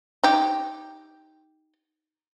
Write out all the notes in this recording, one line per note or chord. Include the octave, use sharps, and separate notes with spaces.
D#4 G4